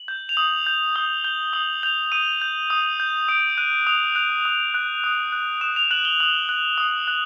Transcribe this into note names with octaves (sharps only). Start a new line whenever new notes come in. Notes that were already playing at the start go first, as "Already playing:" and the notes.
Already playing: F#7
G6
F7
D#6 F#7
G6
D#6 G7
G6 G7
D#6 F#7
G6 F7
D#6 D#7
G6
D#6
G6
D#6 D7
F#6 D#7
D#6 F7
F#6 F7
D#6
F#6
D#6
F#6
D#6 E7
F7
F#6 F#7
G7
D#6 F#7
F#6
D#6
F#6